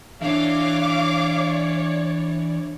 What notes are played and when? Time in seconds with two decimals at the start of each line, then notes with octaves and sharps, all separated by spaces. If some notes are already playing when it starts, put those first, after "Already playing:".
0.22 E3 D4 C#5 D5 E5 F5 D6